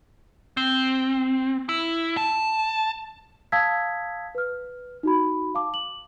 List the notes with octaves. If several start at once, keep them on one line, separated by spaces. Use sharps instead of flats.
C4
E4
A5
F5 A5 D#6 E6 G#6 B6
B4 F6
D#4 F#4 B5
F5 A5 D6
F#7